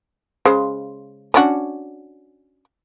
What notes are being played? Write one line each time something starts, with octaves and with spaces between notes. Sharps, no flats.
C#3 G#3 C5
C#4 D4 F#4